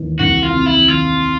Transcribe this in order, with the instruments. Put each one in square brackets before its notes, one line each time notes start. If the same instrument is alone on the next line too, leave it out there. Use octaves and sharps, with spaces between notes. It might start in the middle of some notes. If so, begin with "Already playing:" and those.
Already playing: [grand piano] D#2 E3
[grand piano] C2 [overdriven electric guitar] F#4
[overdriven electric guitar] F4
[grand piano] C3
[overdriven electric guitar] E4
[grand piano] D#3 [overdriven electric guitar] F4